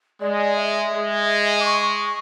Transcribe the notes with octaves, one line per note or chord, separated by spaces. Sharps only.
G#3 D5
E5
G#3
D6
C#6